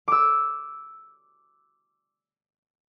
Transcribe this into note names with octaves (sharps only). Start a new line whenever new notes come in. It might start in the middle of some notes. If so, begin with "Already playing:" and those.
D6 E6